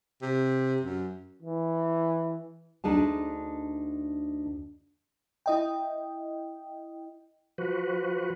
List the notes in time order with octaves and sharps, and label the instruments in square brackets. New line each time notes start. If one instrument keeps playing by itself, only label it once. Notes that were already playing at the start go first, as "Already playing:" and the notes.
[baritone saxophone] C3
F#2
[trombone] E3
[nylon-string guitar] D2 D4 D#4 G#4 A5
[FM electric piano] E4 D#5 G5
[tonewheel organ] F3 F#4 B4